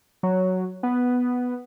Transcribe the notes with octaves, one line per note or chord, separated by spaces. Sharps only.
F#3
B3